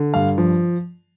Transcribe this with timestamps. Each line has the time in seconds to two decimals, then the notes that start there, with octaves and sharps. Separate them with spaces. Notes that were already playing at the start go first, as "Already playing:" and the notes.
Already playing: D3
0.14 G2 F5
0.38 F3